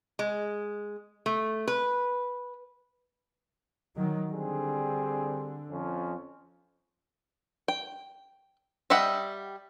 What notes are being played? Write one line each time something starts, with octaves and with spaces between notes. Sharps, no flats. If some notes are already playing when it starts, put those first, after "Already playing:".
G#3
A3
B4
D#3 F#3
D3 G3 C4 G#4
F2 F3 C#4
G5
G3 D#5 E5 F#5 G5